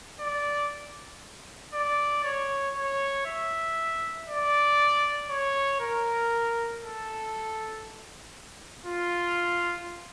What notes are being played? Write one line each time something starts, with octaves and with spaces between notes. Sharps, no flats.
D5
D5
C#5
C#5
E5
D5
C#5
A#4
A4
F4